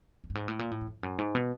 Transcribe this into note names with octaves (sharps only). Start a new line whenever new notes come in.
F2
G2
G#2
A2
A#2
A2
F#2
F2
F#2
G#2
B2